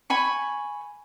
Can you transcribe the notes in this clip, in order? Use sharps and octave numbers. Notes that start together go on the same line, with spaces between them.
G#5 B5 C#6